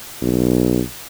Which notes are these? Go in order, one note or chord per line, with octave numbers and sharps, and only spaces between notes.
B1